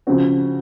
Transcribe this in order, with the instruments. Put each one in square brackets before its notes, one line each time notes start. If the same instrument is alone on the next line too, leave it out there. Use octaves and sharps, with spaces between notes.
[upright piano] C#3 F3 C4 F#4